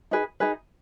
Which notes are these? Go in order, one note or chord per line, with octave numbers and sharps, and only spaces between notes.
D#4 G#4 B4
D#4 G#4 B4